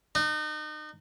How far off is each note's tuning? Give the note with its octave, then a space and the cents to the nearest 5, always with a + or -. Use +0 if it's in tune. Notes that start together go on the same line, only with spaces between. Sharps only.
D#4 -35